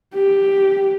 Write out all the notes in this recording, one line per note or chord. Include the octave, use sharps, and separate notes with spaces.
G4